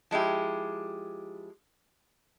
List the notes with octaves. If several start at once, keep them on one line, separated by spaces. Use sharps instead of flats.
F3 G#3 E4 G4